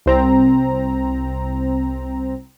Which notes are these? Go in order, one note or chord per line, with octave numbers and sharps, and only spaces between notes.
C2 C4 A#5